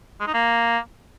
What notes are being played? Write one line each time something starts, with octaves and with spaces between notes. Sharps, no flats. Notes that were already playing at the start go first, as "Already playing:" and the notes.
G#3
D#4
A#3